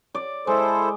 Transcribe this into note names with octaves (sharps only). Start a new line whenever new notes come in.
D5
G#3 E4 A4 C5